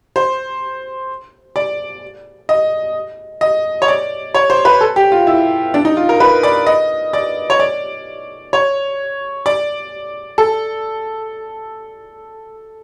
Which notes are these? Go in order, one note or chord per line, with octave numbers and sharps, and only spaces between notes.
C5
D5
D#5
D#5
C#5
D5
C#5
C5
B4
A4
G4
F4
E4
D4
D#4
F4
A#4
B4
D5
D#5
D5
C#5
D5
C#5
D5
A4